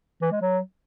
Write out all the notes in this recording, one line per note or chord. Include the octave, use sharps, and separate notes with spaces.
E3
G#3
F#3